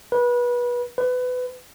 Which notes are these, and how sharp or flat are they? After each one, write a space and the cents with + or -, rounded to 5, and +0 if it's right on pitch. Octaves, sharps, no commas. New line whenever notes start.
B4 -25
B4 +25